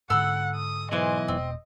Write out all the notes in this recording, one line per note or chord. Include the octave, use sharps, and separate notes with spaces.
G#2 D3 A4 F#5 B5 E6
D#6
B1 E3 G#4 C5 D#5
E1 B2 C4